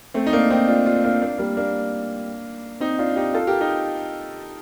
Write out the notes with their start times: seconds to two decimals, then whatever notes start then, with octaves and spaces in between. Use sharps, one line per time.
0.14 A3 C4
0.26 D#4
0.33 A#3 D4
0.50 C4 D#4
0.68 D4 F4
0.86 D4 F4
1.04 A#3 D4
1.22 A#3 D4
1.38 G3 A#3
1.57 A#3 D4
2.80 C4 D#4
2.99 D4 F4
3.16 D#4 G4
3.34 F4 A4
3.47 G4 A#4
3.61 D#4 G4